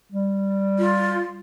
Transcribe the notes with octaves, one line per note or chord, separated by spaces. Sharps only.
G3
F4